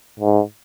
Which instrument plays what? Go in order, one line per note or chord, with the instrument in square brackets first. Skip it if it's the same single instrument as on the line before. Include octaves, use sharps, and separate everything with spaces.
[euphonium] G#2